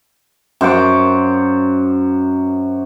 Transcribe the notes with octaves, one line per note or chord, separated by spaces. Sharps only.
F#2 C5 F#5 D6